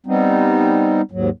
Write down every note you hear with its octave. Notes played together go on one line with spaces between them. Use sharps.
G3 B3 C4 D#4
D#2 G#2 F#3